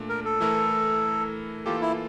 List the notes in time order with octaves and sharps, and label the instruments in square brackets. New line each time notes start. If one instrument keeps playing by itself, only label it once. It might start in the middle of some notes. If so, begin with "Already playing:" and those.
Already playing: [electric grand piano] A#2 A3 D4
[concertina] A#4
A4
[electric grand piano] E3 A3 E4 A#4
[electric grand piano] E3 A#3 F4 A4 [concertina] G4
[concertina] E4